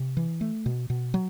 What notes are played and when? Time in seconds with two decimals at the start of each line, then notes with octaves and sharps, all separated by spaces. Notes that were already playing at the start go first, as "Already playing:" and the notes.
Already playing: C3
0.17 E3
0.41 A3
0.66 B2
0.90 B2
1.14 F#3